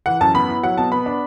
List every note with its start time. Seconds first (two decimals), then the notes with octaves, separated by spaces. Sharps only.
0.06 E3 F#5
0.21 F#2 A5
0.35 B3 B5
0.49 E4
0.63 F#3 F#5
0.78 B2 A5
0.92 B3 B5
1.06 D4